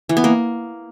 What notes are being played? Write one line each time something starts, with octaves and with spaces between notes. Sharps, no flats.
E3
B3
A#3